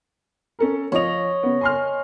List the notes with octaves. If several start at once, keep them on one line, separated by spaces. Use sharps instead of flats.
C#4 A4 A#4
F3 C#5 D#5 F7
C#3 B3
G#5 C6 F6